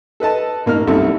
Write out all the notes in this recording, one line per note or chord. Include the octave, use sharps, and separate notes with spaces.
A4 B4 D#5 A5
A1 A#3 D#4 F6
C2 F#2 C3 D#4 A4 E5